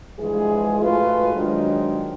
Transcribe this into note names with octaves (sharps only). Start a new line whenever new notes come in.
G2 E3 F3 G#3 G#4
G#2 G#3 A3 F4 F#4 B4
D#3 F3 F#3 G#3 D4